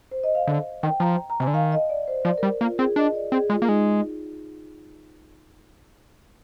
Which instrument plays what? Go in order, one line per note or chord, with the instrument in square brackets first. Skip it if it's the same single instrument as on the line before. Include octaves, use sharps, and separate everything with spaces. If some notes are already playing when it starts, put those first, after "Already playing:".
[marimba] C5
D#5
F5
[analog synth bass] D3
[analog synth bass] D#3 [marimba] G5
[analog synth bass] F3 [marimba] A#5
[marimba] A#5
[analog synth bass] C3 [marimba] G#5
[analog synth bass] D3
[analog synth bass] D#3 [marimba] F5
[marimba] D#5
D5
C5
[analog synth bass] F3 [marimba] D5
[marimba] A#4
[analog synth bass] G3
[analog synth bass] A#3 [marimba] F4
[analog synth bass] C4 [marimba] G#4
[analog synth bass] D4 [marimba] D#5
[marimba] D5
[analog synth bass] C4 [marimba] G#4
[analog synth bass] G#3 [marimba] F4
[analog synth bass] A#3
[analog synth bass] G#3 [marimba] D#4